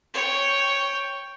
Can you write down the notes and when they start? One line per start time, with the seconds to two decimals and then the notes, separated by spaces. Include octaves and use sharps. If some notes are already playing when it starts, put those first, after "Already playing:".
0.14 C#5 G5